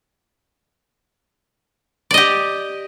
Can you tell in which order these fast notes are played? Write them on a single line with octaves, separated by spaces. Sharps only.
D5 D#5 G4